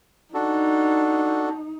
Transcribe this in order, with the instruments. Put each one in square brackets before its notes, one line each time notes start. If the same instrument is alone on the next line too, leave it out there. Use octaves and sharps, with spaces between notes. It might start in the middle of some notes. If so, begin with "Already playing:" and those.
[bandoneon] D4 F#4 A4 [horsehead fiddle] D#4